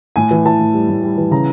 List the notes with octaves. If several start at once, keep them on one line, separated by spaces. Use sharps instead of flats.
A2 G#5
E3
E3 A5
A2
G3
A2
G3
E3
C#3 A#5